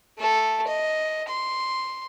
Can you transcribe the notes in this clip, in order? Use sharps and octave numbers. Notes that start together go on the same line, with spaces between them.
A3 A4
D#5
C6